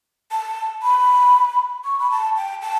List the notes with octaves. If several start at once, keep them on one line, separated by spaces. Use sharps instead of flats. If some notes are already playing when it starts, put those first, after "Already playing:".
A5
B5
C#6
B5
A5
G5
A5